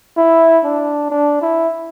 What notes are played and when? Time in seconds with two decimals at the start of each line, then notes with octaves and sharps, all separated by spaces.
0.17 E4
0.64 D4
1.10 D4
1.42 E4